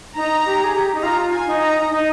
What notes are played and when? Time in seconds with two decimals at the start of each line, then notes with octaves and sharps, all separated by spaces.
0.15 D#4 A#5
0.45 G4
0.64 G#4
0.74 G4
0.95 D#4
1.02 F4 A#5
1.33 G#5
1.47 D#4
1.61 A#5
1.90 D#4